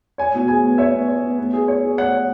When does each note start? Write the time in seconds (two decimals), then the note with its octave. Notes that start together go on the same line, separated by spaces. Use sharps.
0.18 C#5 G#5
0.34 B2
0.48 G#4 G#5
0.63 B3
0.78 C#5 E5
0.94 B3
1.08 C#5
1.23 B3
1.38 B3
1.53 G#4
1.68 C#5
1.82 G#4
1.98 C#5 F#5
2.12 C#5